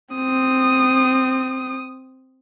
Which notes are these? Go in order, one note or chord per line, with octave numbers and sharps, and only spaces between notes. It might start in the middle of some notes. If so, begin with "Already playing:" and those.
C4 D#6